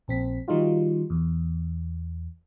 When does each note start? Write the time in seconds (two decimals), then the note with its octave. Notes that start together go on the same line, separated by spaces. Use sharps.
0.08 A#1 C4 B6
0.48 D#3 G3 D#4 F4 F#4
1.10 E2